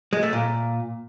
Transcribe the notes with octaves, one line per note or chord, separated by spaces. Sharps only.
G#3
A3
A#2